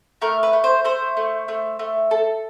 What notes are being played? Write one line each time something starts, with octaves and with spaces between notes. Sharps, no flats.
A3 A#4
B4
A3
C5
A3 C5
A3
A3
A3
A4